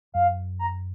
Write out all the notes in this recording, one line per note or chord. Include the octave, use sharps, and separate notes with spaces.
F#2 F5
A#5